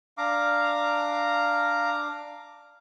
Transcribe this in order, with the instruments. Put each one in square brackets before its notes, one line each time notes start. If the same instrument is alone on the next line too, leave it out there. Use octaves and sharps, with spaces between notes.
[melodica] D4 D6 [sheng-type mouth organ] F5 A#5